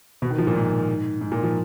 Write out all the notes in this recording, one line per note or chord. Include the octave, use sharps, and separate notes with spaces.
B2
D#3
F3
A#2
G#2
G#2
A#2
F3